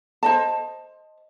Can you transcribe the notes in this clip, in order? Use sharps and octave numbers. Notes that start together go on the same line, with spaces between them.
C5 D#5 A5